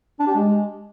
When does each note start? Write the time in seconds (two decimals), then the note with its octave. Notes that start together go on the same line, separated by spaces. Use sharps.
0.19 D4
0.27 G4
0.35 G#3